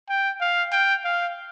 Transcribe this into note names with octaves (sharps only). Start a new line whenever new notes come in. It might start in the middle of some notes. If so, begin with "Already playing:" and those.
G5
F5
G5
F5